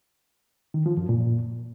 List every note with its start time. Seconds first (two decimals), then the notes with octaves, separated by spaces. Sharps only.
0.74 D#3
0.86 F3
0.97 F#2
1.09 A#2